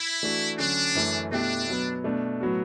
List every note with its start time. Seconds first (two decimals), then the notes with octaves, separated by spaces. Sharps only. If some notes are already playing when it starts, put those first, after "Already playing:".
Already playing: E4
0.23 E3 A3 D4 F#4
0.58 D3 F#3 C#4 D4 F#4
0.95 F#2 E3 A3 C#4
1.31 B2 A3 D4 E4 G4
1.67 B2 F#3 B3
2.04 B2 A3 D4
2.41 A2 F#3 B3 F#4